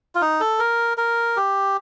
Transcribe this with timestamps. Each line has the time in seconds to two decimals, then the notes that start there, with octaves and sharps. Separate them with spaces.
0.15 F4
0.22 D#4
0.40 A4
0.59 A#4
0.97 A#4
1.37 G4